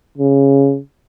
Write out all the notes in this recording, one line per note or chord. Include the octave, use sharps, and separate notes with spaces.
C#3